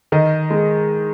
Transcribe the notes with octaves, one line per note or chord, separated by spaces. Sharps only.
D#3 D#5
G#3